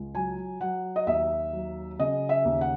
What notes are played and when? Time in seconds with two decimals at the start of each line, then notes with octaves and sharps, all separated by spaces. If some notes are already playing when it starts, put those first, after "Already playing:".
Already playing: C#2
0.15 F#3 G#5
0.60 F#3 F#5
0.96 D#5
1.07 D#2 E5
1.53 F#3
1.99 C#3 D#5
2.29 E5
2.45 D#2
2.61 F#5